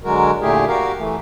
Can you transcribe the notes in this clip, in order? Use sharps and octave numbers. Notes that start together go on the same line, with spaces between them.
D3 F#3 G#3 F#4 A#4
A#2 D3 A3 E4 G4 G#4
F#4 G4 A#4 F5
E3 A3